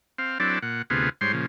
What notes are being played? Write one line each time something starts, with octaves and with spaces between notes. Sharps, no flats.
C4 F5
F#3 C4 D4 E4 A4 D5
A#2 F#5
D2 C3 B3 F4 G#4
G#2 G3 C5 C#5 C6
A#2 C#3 F3